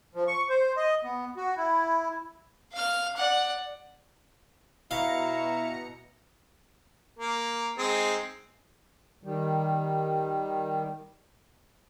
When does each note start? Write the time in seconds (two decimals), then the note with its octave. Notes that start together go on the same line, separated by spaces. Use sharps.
0.15 F3
0.28 C#6
0.49 C5
0.77 D#5
1.04 B3
1.37 F#4
1.57 E4
2.73 F5 F6
3.16 D5 F#5
4.91 B2 E4 F5 A#5 C#7
7.19 A#3
7.78 G#3 C4 D#4
9.24 D#3 G3